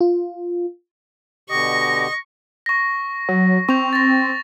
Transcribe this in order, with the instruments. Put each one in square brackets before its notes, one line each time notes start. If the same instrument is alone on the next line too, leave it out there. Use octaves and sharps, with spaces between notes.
[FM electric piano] F4
[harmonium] B2 D3 G4 [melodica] D#5 [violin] C#6 [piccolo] A#6
[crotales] C#6 A#6
[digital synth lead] F#3
[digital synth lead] C4 [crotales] C#6 F7
[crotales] A6 A#6